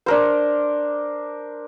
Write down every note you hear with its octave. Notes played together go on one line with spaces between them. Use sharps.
D4 A#4 C5